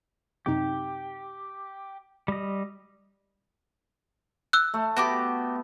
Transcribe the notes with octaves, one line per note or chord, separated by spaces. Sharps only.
F#2 C3 D#4 G4
G3 D#5
E6 F#6
A3
B3 F#4 G4 D6